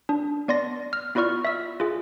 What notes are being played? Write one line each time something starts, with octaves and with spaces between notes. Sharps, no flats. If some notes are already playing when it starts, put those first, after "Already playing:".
D4
B3 D5 C6 A#6
F6
B3 E4 F4 D5 C#6 F6
E5 E6
F4 G#4